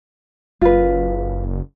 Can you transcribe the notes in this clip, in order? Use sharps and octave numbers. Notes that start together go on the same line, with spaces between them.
F#1 F4 B4